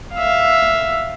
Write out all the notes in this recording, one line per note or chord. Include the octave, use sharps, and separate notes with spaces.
E5 F5